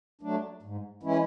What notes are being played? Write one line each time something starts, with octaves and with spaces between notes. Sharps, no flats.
F#3 A3 D4
G#2
E3 G#3 C#4 E4